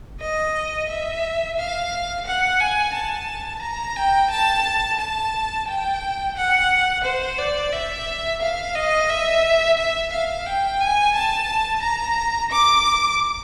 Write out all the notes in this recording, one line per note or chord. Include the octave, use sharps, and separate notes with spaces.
D#5
E5
F5
F#5
G#5
A5
A#5
G5
A5
A5
G5
F#5
C5
D5
E5
F5
D#5
E5
E5
F5
G5
G#5
A5
A#5
D6